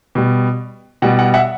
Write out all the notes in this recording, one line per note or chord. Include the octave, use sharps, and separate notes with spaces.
B2 G3
B2 G3 F#5
F#5
E5 F#5